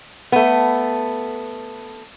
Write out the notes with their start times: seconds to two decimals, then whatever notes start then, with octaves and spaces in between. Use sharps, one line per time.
0.32 A3 B3